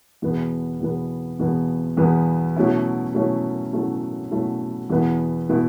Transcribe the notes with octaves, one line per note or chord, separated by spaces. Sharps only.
E2 B2 B3
E2 B2 B3
E2 B2 B3
E2 B2 B3
B2 F#3 A3 C#4 E4
B2 F#3 A3 C#4 E4
B2 F#3 A3 C#4 E4
B2 F#3 A3 C#4 E4
E2 B2 B3 E4
B2 B3 E4